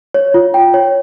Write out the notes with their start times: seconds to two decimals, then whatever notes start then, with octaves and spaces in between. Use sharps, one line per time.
0.14 C#5
0.34 F4
0.54 G5
0.74 C#5